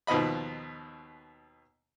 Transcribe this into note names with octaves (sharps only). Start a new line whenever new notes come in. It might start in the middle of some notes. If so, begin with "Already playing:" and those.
D#2 B2 F3 D#5 B5